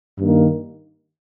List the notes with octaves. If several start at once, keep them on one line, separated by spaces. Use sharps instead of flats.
G2 D#3 A#3